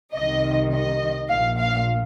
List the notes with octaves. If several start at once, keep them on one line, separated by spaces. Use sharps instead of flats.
C2 C3 D#3 D#5
D#5
A#1 A#2 F5
F5